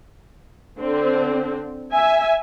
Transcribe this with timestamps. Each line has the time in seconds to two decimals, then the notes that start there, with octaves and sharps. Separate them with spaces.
0.78 D3 C4
1.93 E5 G#5